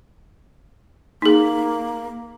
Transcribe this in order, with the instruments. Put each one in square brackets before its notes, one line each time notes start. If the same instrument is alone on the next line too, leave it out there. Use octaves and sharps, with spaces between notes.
[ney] A#3 [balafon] D#4 G#4